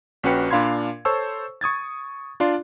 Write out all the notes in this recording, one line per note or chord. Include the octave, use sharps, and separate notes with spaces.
A#1 C#4 F#4 B4 G5 C#7
A#2 D4 F5 B5 C6 G#6
A4 C5 C#5 A5 C#6 E6
C#6 D#6 G#6 A6
D4 F4 D5 C6